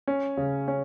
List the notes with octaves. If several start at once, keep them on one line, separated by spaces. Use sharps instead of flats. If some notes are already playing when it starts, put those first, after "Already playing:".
C#4
C#3
C#4